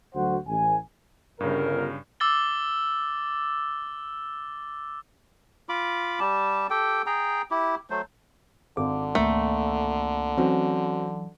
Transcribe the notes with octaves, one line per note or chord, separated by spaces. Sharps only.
D2 F#3 F#4 C5 F#5
A1 G#5
G1 G2 C#3 A#4
D6 E6 A6 G7
F4 B5 D6
G3 G4 A5
G4 A4 G5
G#4 G5 A#5
E4 G4
F#3 A3 C5
G#1 D3 D6
C#2 A3 A#3 A#5
E3 F#3 C4 C#4 F#4